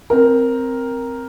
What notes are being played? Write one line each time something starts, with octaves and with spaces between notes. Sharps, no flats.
C4 A#4